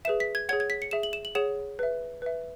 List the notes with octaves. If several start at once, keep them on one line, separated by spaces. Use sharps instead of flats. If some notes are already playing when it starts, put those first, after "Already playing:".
G#4 B4 E5 E7
B6
G#6
G#4 C#5 F#5 G#6
G#6
B6
C#7
G#4 E5 E7
F#7
E7
F#7
G#4 C#5 F#5 E7
B4 E5
B4 E5